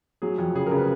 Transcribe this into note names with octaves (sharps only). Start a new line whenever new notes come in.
F#3 G#4
F2
C#3 G#4
C#3 A#4
B4